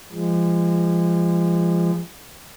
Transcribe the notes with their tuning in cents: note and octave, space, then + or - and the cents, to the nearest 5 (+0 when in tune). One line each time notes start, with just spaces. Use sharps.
F3 -30 G#3 -25